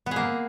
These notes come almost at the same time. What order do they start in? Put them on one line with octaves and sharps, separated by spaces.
B3 G#4 A#3